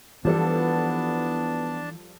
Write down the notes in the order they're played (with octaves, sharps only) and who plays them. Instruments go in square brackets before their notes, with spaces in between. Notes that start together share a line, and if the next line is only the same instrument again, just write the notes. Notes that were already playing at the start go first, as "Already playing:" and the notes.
[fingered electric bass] E3 [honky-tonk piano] F3 G3 A4 [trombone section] B3 [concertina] D4 A5